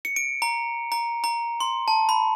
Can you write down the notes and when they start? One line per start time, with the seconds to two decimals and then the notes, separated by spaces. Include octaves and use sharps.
0.05 C#7
0.16 D7
0.42 A#5
0.92 A#5
1.24 A#5
1.60 C6
1.88 A5
2.09 B5